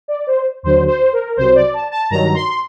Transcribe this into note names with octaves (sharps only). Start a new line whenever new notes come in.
D5
C5
D#2 D3 F#3 C5
C5
A#4
C2 C3 F#3 C5
D5
A5
A5
G2 D#3 F#3 A#5
C6